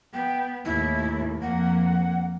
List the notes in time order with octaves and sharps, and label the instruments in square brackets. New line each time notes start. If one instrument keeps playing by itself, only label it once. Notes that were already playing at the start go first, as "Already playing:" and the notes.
[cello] B3 [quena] G5
[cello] D#2 A2 [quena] E4
[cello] F2 A#3 [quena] F#5